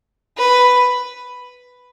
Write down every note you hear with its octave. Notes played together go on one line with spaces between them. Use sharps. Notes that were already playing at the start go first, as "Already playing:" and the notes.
B4